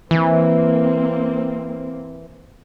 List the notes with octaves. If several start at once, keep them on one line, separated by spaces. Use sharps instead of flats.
E3 A#3 C4